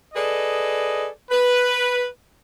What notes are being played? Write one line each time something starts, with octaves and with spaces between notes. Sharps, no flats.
G#4 A4 B4 D5 D#5
B4